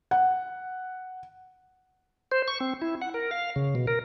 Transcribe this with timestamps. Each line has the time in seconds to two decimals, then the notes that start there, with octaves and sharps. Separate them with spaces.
0.11 F#5
2.32 C5
2.48 C#6
2.60 C4
2.82 E4
3.01 F#5
3.14 A#4
3.31 F5
3.56 C#3
3.75 B2
3.87 A#4